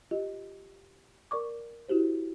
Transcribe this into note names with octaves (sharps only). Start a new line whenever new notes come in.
F4 G4 D#5
A#4 D5 C#6 D6
E4 F#4 G4 C5